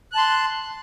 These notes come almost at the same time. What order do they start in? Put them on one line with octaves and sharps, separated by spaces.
F#6 A5 C6